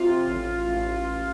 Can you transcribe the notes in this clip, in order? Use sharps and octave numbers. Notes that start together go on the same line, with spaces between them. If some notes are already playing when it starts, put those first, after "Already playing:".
Already playing: C3 F4
A1
A1